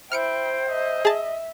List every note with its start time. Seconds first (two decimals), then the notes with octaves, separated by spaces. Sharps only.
0.12 E4 C5 G5 F6 C#7 D7
0.70 D#5 E5
1.05 G#4 A5